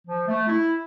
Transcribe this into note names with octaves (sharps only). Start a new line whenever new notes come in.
F3
A3
E4